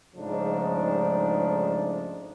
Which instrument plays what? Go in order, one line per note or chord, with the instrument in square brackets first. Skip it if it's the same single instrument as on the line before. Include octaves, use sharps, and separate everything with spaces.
[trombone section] G#2 C#3 F3 A3 D4 D#4